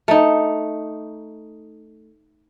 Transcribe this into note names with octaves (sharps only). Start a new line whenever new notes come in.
A3 D#4